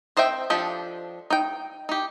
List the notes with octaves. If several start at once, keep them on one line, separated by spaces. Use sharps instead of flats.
C4 C5 D#5 E5 G5
F3 D4 G4 A4 D#5
D#4 G5
D#4 G4